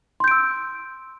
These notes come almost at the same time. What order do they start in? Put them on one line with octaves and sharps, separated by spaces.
C6 G6 D7 E6